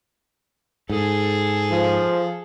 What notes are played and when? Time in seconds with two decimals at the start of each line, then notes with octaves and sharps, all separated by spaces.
0.89 G#2 G#4 A4
1.71 F3